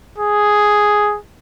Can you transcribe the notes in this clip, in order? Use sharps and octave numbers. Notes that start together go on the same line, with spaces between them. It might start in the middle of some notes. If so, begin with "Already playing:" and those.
G#4